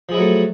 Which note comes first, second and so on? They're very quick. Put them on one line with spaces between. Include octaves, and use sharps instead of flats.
F3 G#4 E4 F#3 A3